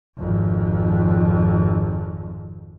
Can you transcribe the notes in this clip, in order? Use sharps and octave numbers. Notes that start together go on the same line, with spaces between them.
G#1 F2